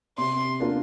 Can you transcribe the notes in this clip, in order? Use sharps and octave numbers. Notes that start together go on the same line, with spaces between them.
C3 C6
A#3 D4 F4 A#4